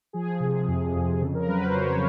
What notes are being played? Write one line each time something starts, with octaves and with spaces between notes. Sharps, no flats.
F3 G#4
C3
F2
F2
C#3 A4
A#4
F#3 B4
C5
C#3 C#5